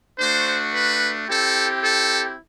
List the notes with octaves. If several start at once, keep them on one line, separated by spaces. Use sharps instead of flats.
A3 D4 F#4 C5
B4
C4 E4 G4 A4
A4